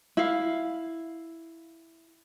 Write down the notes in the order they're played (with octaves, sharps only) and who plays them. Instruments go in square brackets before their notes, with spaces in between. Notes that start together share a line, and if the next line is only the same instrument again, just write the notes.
[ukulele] E4 F5